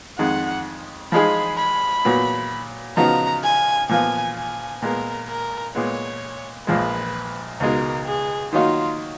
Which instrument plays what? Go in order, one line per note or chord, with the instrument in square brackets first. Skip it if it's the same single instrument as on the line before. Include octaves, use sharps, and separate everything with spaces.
[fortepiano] F2 D#3 G#3 [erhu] F#5
[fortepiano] F3 G#3 D#4 G#4 [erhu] B5
[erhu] B5
[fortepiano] A#2 F#3 B3
[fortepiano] C#3 F3 B3 D#4 F#4 [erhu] A#5
[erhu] G#5
[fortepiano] A#2 F3 B3 F4 [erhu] G#5
[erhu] G#5
[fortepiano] A#2 G#3 B3 [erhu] A#4
[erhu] A#4
[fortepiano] A#2 G#3 B3 [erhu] C#5
[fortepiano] A#1 A#2 F3 G#3 [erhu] B4
[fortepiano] C#2 B2 G#3 D#4 [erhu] A#4
[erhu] G#4
[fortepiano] D#3 F#3 A#3 D#4 F#4 [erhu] F4